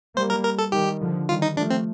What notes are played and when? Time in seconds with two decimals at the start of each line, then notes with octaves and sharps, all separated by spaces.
0.16 G3 A#3 C5
0.30 A#4
0.45 A#4
0.59 A4
0.72 D#3 G3 G4
1.01 D3 F3
1.28 D#3 G3 F4
1.42 D#4
1.56 F3 A3 D4
1.70 C4